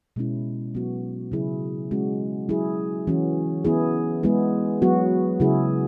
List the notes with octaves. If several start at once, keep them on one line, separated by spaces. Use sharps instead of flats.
B2 G#3 C#4 E4
F#3 B3 F#4
C#3 F#3 E4 G#4
G#3 C#4 F#4
F#3 E4 G#4
E3 C#4 F#4
E3 B3 E4 G#4
G#3 B3 E4 G#4
F#3 B3 F#4
C#3 F#3 E4 G#4